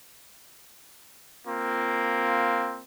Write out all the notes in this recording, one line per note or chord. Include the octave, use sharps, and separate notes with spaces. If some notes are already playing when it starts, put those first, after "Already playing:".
A#3 C4 F4